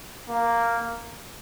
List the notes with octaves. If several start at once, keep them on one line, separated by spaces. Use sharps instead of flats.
A#3